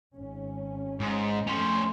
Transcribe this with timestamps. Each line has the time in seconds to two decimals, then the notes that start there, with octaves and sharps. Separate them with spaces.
0.15 G#1 C#4
1.00 G#2
1.47 F2 A3 C#4 C5